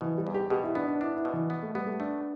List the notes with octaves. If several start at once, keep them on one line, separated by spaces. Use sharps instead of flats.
B2 E3
G3
E2
G4
B2 G4
E4
B3 D4
D4
D4 E4
E4
B2
E3
B3
A3
G3 B3
A3
A3 D4